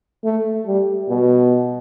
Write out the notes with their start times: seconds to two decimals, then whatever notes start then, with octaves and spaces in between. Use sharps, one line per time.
0.24 A3
0.67 G3
1.09 B2